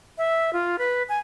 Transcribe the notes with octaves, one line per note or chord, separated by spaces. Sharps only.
E5
F4
B4
G#5